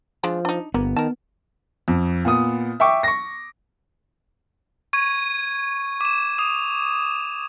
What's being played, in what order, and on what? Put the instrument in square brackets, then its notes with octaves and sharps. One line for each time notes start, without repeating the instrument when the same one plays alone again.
[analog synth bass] F3 [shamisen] G#3 D4 F4
[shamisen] D4 D#4
[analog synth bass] G1 [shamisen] A#3 [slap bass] B3
[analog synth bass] D#3 [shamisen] A#4 A5
[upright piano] F2
A#2 B3 D#6
E5 G5 C#6 D6
C#6 A#6
[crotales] C#6 G#6 D#7
D6 E7
D#6